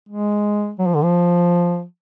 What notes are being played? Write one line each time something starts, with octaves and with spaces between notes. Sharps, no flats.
G#3
F#3
F3
D3
F3